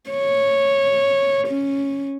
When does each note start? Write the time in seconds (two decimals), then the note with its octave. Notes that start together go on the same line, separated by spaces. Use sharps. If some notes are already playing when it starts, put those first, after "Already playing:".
0.10 C#5
1.47 C#4